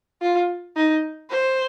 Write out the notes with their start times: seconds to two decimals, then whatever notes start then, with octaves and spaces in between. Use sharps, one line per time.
0.22 F4
0.76 D#4
1.30 C5